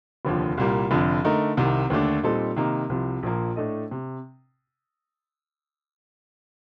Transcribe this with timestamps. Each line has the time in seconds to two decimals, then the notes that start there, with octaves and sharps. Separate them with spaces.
0.25 F1 D#2 D3 F3
0.57 C2 A#2 G3 A#3
0.91 F1 F2 D3
1.24 D3 A3 D#4 A#4
1.57 C2 C3 D#3
1.90 D#2 D3 A3 D4
2.23 A#2 G3 C4 D#4 A4
2.56 C3 D#3 A#3 D#4
2.89 C2 C3 F3
3.23 A#1 A#2 F3 A#3
3.56 A2 A3 D4 A4 D#5
3.91 C3